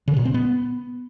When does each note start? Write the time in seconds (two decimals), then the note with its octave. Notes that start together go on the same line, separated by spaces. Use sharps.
0.08 C#3
0.17 A#2
0.25 C4
0.34 B3